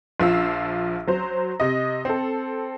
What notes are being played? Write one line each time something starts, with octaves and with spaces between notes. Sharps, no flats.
A#1 F3 F5 E6
F#3 C5
C3 D#5
C4 A4